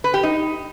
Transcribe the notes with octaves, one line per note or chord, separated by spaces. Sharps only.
B4
G4
D#4